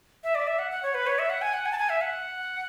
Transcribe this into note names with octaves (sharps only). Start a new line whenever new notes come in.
E5
D5
E5
F#5
F#5
C#5
B4
C#5
E5
F#5
G#5
F#5
G#5
A5
G#5
E5
F#5